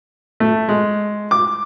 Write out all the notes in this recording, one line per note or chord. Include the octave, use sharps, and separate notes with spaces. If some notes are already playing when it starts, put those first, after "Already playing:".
A3
G#3
D6